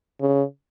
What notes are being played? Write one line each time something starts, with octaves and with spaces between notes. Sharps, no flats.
C#3